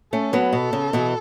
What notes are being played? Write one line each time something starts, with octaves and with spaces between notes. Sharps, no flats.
A3 C#4 A4
F#3 B3
B2 A4
C#3
B2 E3